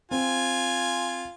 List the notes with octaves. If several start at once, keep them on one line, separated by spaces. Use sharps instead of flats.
C4 F4 G#5